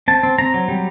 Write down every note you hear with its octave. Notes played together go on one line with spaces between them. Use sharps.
C4 A5
C4
C4 A#5
F#3
G3